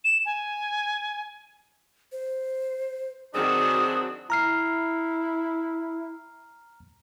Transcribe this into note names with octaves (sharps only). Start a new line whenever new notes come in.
E7
G#5
C5
D#3 F#3 C4 D4 F#4 G#4 D#6
E4 A#5 F6 C7